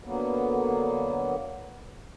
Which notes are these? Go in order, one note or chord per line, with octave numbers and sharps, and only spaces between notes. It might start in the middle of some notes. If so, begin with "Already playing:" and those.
D3 F#3 A#3 B3